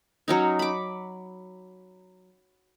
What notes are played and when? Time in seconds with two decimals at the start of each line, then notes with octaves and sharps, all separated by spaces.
0.28 F#3 C#4 D#4
0.59 B5 D6